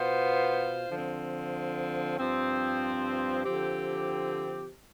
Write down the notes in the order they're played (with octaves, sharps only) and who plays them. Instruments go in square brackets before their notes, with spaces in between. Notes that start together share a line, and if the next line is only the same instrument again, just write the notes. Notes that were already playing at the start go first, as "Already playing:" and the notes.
Already playing: [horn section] B2 B3 F4 C5
D3 F3 C4
G2 F3 C4
D3 F3 C4 G4